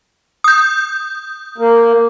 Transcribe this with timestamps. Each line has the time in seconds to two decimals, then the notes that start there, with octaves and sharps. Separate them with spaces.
0.44 D#6 G6
1.58 A#3